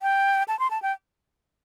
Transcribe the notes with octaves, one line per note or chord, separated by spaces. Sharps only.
G5
A5
C6
A5
G5